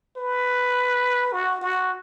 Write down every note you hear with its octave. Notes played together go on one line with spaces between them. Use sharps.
B4
F#4
F#4